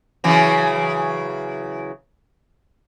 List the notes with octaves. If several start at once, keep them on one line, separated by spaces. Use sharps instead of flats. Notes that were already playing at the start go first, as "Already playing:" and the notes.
C#3 E3 F#3